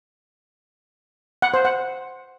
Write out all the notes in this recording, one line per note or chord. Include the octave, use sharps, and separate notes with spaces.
F#5
C5
F#5